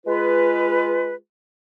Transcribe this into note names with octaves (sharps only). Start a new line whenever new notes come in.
G#3 F4 B4